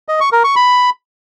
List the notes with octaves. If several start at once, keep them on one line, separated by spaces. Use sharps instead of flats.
D#5
C#6
A#4
C#6
B5